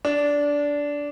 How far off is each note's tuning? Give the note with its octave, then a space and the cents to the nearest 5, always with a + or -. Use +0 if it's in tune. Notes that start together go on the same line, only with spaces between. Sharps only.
D4 -15